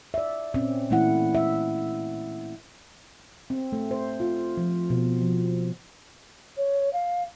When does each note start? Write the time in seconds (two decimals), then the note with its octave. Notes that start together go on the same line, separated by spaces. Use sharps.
0.14 D5 E5
0.54 A#2 C4 C#4
0.90 A#2 E3 A3 A#3 E4 F#5
1.35 E5
3.50 C4
3.72 A3
3.91 C5
4.20 F4
4.57 F3
4.90 B2
5.22 F3
6.57 C#5
6.93 F5